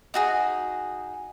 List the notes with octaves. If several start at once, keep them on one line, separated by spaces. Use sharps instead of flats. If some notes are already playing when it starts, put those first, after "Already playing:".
D#4 F#4 G#4